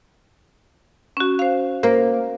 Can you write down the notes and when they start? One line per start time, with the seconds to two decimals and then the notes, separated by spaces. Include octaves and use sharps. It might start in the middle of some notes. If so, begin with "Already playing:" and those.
1.17 C#4 F#4
1.39 C5 F5
1.83 A#3 C5